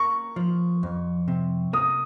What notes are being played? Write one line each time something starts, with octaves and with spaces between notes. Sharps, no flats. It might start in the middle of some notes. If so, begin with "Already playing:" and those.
Already playing: A#3 C#6
F3
F2
C3
A#3 D#6